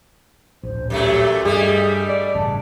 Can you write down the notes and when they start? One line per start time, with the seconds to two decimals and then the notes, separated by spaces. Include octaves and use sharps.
0.63 D1 A#1 C5
0.90 F#2 A#2 A3 G4
1.45 G2 G3 A3 G#4 D#5
2.09 D5
2.35 A1 G2 C#3 A5